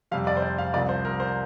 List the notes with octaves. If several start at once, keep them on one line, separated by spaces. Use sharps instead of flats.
F2 C3 G3 F5
D5
C5
D5
F5
C2 C3 F3 D5
C5
A#4
C5